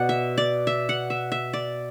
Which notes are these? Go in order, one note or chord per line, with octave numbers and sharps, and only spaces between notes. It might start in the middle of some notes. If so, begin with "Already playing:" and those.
Already playing: B2 D5 F#5
E5
D5
E5
F#5
E5
E5
D5